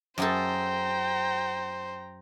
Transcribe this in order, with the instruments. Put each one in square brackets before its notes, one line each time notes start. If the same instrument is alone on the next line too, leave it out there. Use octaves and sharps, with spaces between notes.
[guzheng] F#2 G#4 A4 [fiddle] C5 [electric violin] G5 A#5